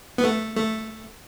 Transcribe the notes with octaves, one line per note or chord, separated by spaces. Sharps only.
B3
A3
A3